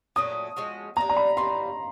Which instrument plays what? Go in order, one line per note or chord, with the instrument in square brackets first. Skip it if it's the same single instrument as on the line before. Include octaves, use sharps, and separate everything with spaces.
[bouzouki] A#2 F#3 A3 [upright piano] D#6
[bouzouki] F3 G#3 C#4 F#4
[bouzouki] G3 A#3 D4 [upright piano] A#5
[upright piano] A#5
B5
[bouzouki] E3 G3 A#3 [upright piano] C6